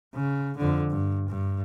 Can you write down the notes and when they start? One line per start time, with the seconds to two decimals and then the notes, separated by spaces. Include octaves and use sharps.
0.15 C#3
0.58 F2 D3
0.90 G2
1.29 G2